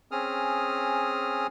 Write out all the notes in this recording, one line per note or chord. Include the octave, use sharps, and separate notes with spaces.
C4 C#4 G#4 D#6 F6